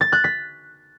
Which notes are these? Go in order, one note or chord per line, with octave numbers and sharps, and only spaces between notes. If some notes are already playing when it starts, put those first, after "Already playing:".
A6
F#6
B6